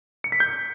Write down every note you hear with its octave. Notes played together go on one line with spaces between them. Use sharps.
C#7
B6
G6